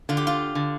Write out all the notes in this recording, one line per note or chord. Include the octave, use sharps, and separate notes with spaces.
D3 F4
G4
F4
D3